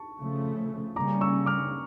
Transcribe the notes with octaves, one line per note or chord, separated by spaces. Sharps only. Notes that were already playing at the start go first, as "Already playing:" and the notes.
Already playing: A5 C#6
C#3 F3 A3
C#3 G3 A#3 C#4 A#5 D6
C#6 E6
D6 F6